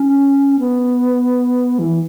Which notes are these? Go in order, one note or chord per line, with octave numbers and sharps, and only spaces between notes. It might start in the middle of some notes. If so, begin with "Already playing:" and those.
Already playing: C#4
B3
E3